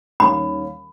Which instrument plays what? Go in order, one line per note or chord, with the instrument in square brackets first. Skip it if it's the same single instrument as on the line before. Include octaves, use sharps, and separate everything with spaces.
[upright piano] D#2 D#3 G3 C#4 [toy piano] B5